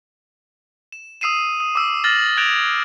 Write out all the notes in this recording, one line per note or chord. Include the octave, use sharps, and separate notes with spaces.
E7
D#6 E6 C7 D#7 E7
D#6
D6 E6
F6 A6 A#6 F#7
F#6 G#6 A#6 D7 E7 F7